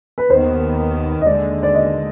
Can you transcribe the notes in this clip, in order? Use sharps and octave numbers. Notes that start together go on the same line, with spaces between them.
B4
D#2 D#3 B3 C5
D#5
D#2 D3 G#3 D5
D5
D#5